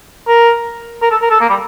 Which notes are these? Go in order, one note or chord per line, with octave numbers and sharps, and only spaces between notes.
A#4
A#4
A4
A#4
A4
A#3
G3